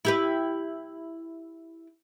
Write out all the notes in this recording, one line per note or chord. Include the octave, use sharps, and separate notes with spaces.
E4 G4 B4